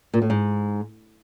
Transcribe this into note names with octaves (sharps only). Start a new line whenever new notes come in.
A#2
A2
G#2